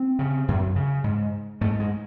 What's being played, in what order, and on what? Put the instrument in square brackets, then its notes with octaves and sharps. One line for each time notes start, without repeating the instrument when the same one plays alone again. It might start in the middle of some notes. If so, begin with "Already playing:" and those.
Already playing: [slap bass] C4
C#3
F#2
C#3
G#2
G#2 A3
G#3